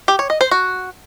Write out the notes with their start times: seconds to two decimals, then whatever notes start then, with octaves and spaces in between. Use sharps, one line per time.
0.08 G4
0.19 C#5
0.30 D#5
0.41 C5
0.51 F#4